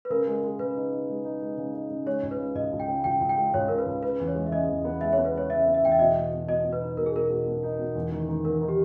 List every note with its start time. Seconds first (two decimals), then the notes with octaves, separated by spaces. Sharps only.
0.05 B4
0.10 C#3 A#4
0.27 G#3
0.43 G#3
0.59 C#3 B4
0.76 D#4
0.92 D#4
1.08 G#3
1.25 D#4
1.42 G#3
1.58 C#3
1.74 D#4
1.90 C#3
2.06 G#3 C#5
2.23 C#2
2.31 B4
2.39 C#3
2.55 C#2 D#5
2.72 C#2
2.80 G5
2.88 C#3
3.04 C#2 G5
3.20 C#2
3.29 G5
3.38 G#3
3.54 C#2 C#5
3.68 C#3 A#4
3.78 B4
3.86 C#2
4.03 C#3 B4
4.20 E2
4.27 C#5
4.35 G#3
4.47 E5
4.51 C#3 D#5
4.69 E2
4.85 B3
5.01 G#3 E5
5.13 C#5
5.18 B3
5.25 B4
5.34 G#3 C#5
5.50 C#3 E5
5.66 B3
5.74 E5
5.83 E2 G5
5.92 E5
5.99 B2 D#5
6.16 B2
6.32 B2
6.48 B2 D#5
6.64 B2
6.73 B4
6.81 D#4
6.97 B2 A#4
7.06 G#4
7.14 B2 A#4
7.30 B2
7.46 B2
7.63 D#4
7.79 B2
7.95 E2
8.12 D#3
8.29 D#3
8.44 E2 A#4
8.61 D#3
8.68 G4